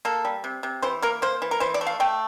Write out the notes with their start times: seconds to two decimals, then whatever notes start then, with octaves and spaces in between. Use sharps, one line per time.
0.05 A#3 A4
0.25 G3
0.44 C3
0.63 C3
0.82 E3 C5
1.02 A#3 A#4
1.22 A#3 C5
1.42 E3
1.51 A#4
1.60 E3 C5
1.74 D5
1.81 A3
1.87 F5
2.00 A3 G5